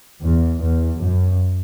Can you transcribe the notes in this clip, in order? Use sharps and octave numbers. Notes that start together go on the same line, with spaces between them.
E2
E2
F#2